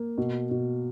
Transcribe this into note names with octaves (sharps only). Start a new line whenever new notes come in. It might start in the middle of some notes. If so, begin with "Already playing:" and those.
Already playing: A#3
B2
B2